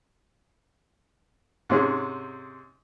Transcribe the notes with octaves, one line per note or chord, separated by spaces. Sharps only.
G#2 C3 C#4 G#4